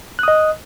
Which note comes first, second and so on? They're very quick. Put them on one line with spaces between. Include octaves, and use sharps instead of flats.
F#6 D#6 D#5